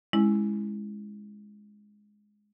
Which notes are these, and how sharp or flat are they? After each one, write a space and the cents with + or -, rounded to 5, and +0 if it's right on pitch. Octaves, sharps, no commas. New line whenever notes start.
G#3 +0 C#4 -10 E4 +0